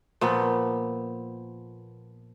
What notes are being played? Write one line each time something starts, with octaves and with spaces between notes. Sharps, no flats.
A#2 F3 B3